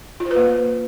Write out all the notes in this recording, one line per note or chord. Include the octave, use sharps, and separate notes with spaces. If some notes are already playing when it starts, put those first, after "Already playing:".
F4
C5
B4
A#3